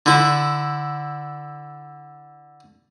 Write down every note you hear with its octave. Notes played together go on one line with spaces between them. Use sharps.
D3 E4